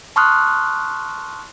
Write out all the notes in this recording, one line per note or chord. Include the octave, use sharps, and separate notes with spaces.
A5 C6 C#6 D#6 F6 F#6